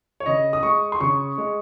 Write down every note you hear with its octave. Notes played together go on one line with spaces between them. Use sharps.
C#5
C#3 D#5
D#6
G#3 C#6
C6
C#3 C#6
G#3